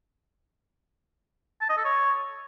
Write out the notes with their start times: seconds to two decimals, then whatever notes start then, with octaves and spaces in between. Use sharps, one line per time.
1.61 A5
1.69 D#5
1.77 A4
1.85 C#5